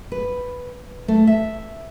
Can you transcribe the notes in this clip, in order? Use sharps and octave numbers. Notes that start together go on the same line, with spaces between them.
B4
A3
E5